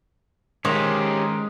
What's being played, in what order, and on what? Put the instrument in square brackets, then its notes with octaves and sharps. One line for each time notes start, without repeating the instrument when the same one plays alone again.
[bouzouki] D#3 [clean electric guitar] G#3 C5 [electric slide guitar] C#4 G4